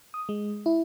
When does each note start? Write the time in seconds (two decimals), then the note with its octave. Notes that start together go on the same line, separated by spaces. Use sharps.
0.14 D#6
0.29 G#3
0.66 E4